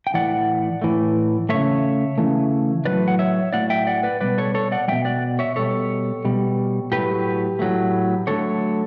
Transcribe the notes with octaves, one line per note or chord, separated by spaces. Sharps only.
G5
A2 E3 A3 D5 F#5
A2 E3 A3
E3 A3 C#5 E5
C#3
C#3 E3 A3
A2 F#3 A3 B4 D5
F#5
C#5 E5
A2 F#3 A3 D5 F#5
E5 G5
D5 F#5
B4 D5
B2 G3 B4 D5
A4 C#5
A4 C#5
D5 F#5
B2 G3 E5 G5
D5 F#5
C#5 E5
B2 G3 A4 C#5
B2 G3
A2 F#3 A3 G4 B4
A2 F#3 A3
D3 F#3 A3 A4 C#5